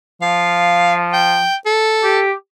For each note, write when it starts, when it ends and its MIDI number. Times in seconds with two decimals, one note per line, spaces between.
0.22 1.46 53
0.22 0.97 77
1.13 1.55 79
1.66 2.23 69
2.03 2.31 67